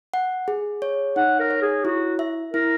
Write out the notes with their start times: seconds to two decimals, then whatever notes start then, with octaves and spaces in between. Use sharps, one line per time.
0.14 F#5
0.48 G#4
0.82 C#5
1.16 D#4 F#5
1.39 A#4
1.50 C#5
1.61 G#4
1.84 E4 F#4
2.19 E5
2.54 E4 A#4